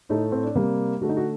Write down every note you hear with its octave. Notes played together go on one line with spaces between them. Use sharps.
A2 A3 D#4
C4
D4
C3 G3 A#3
D3 A3 F#4
D#4
F#4